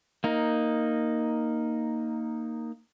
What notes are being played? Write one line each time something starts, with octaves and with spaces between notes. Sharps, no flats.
A#3 D#4